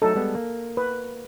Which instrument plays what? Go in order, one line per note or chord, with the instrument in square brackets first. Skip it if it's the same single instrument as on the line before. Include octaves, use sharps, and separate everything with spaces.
[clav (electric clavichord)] F#3 A3 D#4 [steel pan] A4
[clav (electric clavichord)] G3 G#3 B3
A#3
[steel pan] B4